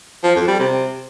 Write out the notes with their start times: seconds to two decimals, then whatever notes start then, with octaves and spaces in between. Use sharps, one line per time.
0.24 F3
0.36 F2
0.48 G3
0.60 C3